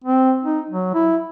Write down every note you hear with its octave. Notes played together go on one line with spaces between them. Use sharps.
C4
D#4
F#3
E4